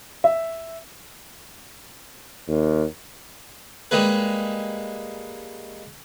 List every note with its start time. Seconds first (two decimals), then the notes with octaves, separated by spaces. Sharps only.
0.24 E5
2.48 D#2
3.91 G3 G#3 A#3 B4